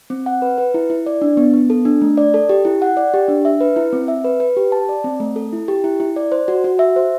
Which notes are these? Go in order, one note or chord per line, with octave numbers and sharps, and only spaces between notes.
C4
F#5
B4
B4
E4
E4
D5
D4
B3
B3
A4
D4
A3
D5
A4
G4
E4
F#5
D5
G4
D4
E5
B4
E4
C4
E5
B4
B4
G4
A5
D5
C4
A3
A4
E4
G4
E4
E4
D5
C5
F#4
F#4
E5
C5